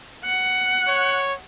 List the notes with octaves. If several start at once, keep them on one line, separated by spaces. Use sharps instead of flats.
F#5
C#5